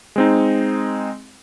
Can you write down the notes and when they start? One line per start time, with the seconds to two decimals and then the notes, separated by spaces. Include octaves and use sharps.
0.16 G#3 C4 D#4